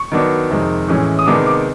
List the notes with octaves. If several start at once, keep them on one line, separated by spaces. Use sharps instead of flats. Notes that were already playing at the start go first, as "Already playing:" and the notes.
Already playing: C#6
D#3 F#3 B3 D4
F2 C3 D#3 G#3
A2 E3 G#3 C#4
D#6
C3 D#3 G#3 B3 D4 D6
D6